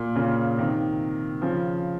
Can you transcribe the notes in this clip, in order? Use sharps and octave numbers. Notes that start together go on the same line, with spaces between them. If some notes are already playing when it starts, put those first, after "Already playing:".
Already playing: A#2
A#2 C#3
C3 D#3
C#3 F3